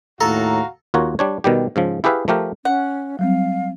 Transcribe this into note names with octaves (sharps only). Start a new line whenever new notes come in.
D#2 A2 F#4 A4 F5 A#5
D#2 F4 F#4 A#4 C#5
G3 D4 C#5
B2 D#3 G3 G4
G#2 C#3 F3
E4 G4 G#4 B4 E5 F5
F3 A3 G4 A#4
C#4 F#5
F#3 G3 C4 F5